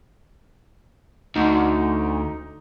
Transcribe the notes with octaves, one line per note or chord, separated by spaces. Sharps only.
D2 D#4